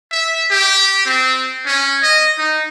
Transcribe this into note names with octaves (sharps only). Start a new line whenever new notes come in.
E5
G4
C4
C#4
D#5
D#4